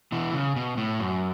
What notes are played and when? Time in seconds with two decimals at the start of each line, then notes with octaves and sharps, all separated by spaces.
0.12 B2 E3
0.34 C#3
0.56 B2
0.77 A2
1.00 F#2